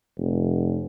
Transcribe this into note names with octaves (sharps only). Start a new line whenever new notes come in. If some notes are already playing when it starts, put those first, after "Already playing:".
F1